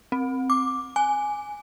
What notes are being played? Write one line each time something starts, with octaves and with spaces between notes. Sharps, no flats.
C4
D6
G#5